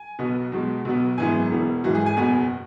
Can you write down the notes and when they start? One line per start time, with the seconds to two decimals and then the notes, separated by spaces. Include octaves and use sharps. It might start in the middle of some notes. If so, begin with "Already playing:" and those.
Already playing: G#5
0.19 B1 B2 B3
0.52 E2 B2 G#3
0.85 B1 B2 B3
1.18 G#1 F#2 E3 G#3 B3 G#5
1.51 E1 E2 E3 B3
1.84 G#1 G#2 E3 F#4
1.95 G#4
2.06 G#5
2.17 F#1 E2 B2 B3 G#5